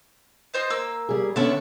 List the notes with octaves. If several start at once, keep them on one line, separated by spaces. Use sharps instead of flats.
F4 C5 D#5
A#3 E6
G3 G#4
D3 B3 C#4 D4 E5 C#6